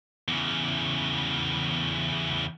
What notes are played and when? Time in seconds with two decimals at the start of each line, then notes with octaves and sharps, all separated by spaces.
0.28 E2 C#3